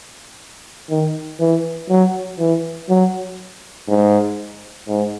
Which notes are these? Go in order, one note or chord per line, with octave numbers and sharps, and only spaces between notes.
D#3
E3
F#3
E3
F#3
G#2
G#2